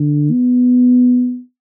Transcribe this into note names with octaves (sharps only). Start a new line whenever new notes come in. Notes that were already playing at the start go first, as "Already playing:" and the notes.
Already playing: D3
B3